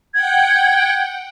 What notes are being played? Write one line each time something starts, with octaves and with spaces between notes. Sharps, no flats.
F#5 G5 G#6